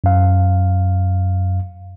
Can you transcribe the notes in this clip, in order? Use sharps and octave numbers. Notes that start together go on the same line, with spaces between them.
F#2 F5